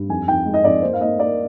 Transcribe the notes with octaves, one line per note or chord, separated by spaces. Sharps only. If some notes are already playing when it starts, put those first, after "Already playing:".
Already playing: G2
F2 G#5
F2 G5
G#3
D#5
F2 D5
A#3 C5
F5
A#3 D#5
A#3 D5